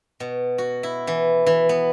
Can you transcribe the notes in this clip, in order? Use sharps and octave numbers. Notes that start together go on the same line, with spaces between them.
B2
F#4
E4
E3
E3
B3